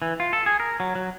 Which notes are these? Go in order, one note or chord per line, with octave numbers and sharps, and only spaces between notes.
E3
F4
A4
G#4
A#4
F#3
F#3